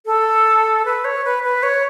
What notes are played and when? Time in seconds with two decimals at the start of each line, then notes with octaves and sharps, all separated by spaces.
0.06 A4
0.85 B4
1.05 C#5
1.25 B4
1.43 B4
1.63 C#5